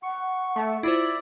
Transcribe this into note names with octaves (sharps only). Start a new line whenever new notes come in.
F#5 C#6
A3
E4 F4 C5 D5 E5 B5